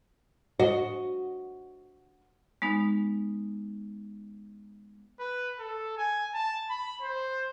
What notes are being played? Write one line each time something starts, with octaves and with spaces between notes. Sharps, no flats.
F#4 D#5
G#3 B3 D#4
B4
A4
G#5
A5
B5
C5